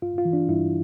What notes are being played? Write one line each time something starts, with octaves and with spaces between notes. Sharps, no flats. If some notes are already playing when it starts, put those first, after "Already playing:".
G2 F4
F4
E3
D4
G2 E4